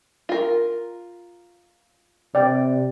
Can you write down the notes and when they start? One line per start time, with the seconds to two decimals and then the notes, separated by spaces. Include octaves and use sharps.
0.29 F4 A#4
2.35 C3 D5 G5